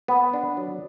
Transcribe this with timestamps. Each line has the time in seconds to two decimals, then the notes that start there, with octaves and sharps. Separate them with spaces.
0.08 B3
0.33 D4
0.57 F#3